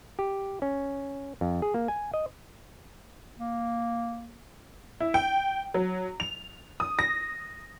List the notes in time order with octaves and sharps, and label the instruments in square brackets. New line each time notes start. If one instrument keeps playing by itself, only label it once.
[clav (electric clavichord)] G4
C#4
F2
G#4
A#3
G#5
D#5
[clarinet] A#3
[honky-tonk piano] E4
G5
F#3
F7
D#6
A#6